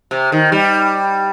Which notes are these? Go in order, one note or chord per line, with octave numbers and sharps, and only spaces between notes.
C3
D#3
G3